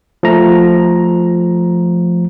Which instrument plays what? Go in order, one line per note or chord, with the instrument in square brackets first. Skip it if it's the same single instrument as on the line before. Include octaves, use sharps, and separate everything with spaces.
[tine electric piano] F3 A3 A#5